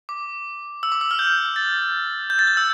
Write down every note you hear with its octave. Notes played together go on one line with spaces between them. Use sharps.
D6
E6
D6
E6
F6
G6
A6
G6
A6
G6
E6